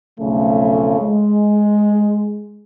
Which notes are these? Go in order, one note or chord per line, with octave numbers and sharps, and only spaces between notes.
B1 F2 C#3 A3
G#3